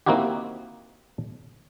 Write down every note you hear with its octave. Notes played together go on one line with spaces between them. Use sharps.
A#3 C4 D#4 E4 F#4 G4